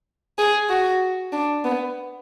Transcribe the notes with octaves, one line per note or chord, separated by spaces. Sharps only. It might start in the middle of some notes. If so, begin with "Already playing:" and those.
G#4
F#4
D4
B3